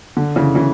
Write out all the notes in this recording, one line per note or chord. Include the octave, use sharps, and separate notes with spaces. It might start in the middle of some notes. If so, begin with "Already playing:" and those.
D3
C#3 E3
C#3 E3